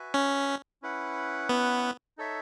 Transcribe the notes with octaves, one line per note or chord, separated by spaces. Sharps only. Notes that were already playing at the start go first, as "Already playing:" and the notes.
Already playing: F#4 B4 E5 G#5
C#4
C#4 E4 B4 F#5
B3
D#4 A4 C#5 E5